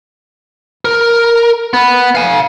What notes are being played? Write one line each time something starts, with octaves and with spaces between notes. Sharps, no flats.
A#4
B3
F5 G#5